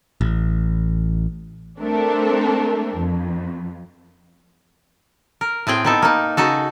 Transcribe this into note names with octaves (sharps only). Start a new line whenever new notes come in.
A1
A3 C4 D4 A4 A#4
F2
A#4
A2 C4 G#4 G5
B3 D#4 A4
A#3 D#4
C#3 D#4 F#4 A4